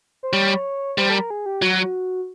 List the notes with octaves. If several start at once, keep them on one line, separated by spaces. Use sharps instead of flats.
C5
G3 C#5
G3 C5
A4
A#4
G#4
G4
F#3 F#4